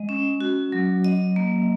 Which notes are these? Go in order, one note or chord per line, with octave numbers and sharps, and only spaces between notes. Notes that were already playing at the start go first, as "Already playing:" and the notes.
Already playing: G#3 D#5
C#4
F#4
F#3
D#5
A#3